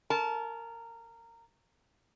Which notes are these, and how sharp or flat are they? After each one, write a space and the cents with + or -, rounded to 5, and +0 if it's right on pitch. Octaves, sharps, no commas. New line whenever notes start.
A#4 -15 A5 -30